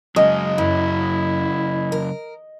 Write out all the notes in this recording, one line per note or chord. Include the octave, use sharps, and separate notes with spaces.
C#3 F#3 G#3 C#4 D#5
F#2 E4
A#4